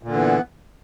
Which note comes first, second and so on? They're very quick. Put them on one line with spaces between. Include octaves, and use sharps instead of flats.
A#2 D3 E3 B3